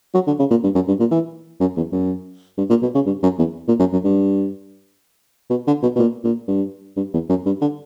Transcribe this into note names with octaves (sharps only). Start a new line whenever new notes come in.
F#3
D3
C#3
A#2
G2
F#2
G2
A#2
E3
F#2
E2
F#2
G2
A#2
B2
C#3
G2
F#2
E2
A#2
F#2
F#2
G2
B2
D3
B2
B2
A#2
A#2
G2
G2
E2
F#2
G2
D3